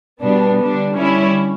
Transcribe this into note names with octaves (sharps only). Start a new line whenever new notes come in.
B2 G3 B3 D4
D3 G3 D4
D3 G3 C#4 E4